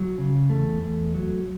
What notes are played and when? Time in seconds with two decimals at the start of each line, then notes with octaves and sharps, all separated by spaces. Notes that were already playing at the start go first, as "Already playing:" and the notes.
Already playing: F#3
0.18 C#3
0.50 E2 A3
0.81 E2
1.15 F#3